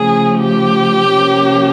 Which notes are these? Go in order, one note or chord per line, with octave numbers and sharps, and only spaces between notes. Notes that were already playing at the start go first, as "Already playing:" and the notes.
Already playing: C#3 F3 A3 G#4
G4
C3 F3 A#3 C#4